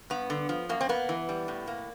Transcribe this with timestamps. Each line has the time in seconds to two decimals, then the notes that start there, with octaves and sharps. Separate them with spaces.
0.10 G2 B3
0.30 D3
0.49 F3
0.69 F#2 A#3
0.81 C4
0.89 A#3 B3
1.09 E3
1.29 G3
1.48 A2
1.67 A#3